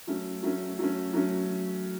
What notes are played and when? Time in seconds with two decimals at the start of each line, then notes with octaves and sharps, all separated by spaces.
0.07 F#3 A3 C#4
0.43 F#3 A3 C#4
0.79 F#3 A3 C#4
1.13 F#3 A3 C#4